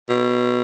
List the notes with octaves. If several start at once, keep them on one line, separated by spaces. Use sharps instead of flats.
B2